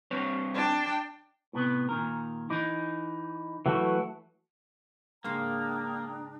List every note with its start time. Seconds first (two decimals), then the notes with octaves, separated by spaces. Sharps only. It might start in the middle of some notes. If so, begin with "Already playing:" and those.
0.11 G2 C4 C#5
0.54 D4 G5
1.53 A2 C3 B3
1.89 A#2 D#3 A#4
2.50 E3 D#4
3.66 E3 F#3 A3 F#4 A4
5.24 G#2 C#3 A#3 D4 G5 A#5 C6 D#6